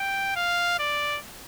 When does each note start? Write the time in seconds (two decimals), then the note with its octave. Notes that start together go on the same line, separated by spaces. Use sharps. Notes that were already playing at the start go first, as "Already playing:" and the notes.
Already playing: G5
0.36 F5
0.79 D5